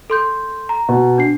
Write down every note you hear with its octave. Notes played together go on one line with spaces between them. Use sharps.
A4 C6 G6
A#5
B2
D4 C7